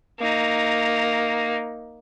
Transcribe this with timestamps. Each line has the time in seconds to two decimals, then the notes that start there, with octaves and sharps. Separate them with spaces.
0.19 A#3 D#4